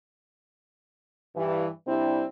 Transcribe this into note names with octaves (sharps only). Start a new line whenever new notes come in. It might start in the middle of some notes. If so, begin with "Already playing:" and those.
G2 E3
C3 G3 C4 D4 E4